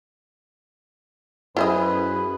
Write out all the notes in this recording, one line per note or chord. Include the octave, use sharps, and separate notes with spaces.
F#2 E4 G#4 B4 C5 D#5